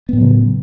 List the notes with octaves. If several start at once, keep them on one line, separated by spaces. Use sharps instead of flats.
A2 C#3 F#3 B3